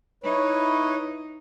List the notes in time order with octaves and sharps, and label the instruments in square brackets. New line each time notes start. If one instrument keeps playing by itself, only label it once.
[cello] D#4 [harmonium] E4 B4 C#5